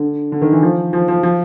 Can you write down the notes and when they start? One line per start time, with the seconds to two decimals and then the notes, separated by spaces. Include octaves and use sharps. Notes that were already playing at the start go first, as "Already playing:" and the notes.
Already playing: D3
0.32 D3
0.42 D#3
0.52 E3
0.62 F3
0.93 F3
1.08 F3
1.23 F3